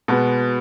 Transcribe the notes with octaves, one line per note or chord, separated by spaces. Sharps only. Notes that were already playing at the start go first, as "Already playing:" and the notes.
B2 G#3 B3